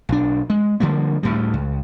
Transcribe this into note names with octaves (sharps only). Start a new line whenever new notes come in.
B1 D4
G#3
D3 F3 G3 A#3
D2 A2 G3
C#2